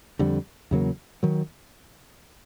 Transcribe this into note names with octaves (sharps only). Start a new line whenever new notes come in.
F2 D3 G3
E2 C#3 F#3 A#3
D#3 F#3